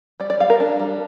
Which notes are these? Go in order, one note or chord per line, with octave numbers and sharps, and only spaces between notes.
G3 D5
D5
G3 F5
A#4
D4
G3